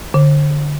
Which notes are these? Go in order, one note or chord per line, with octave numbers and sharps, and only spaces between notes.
D3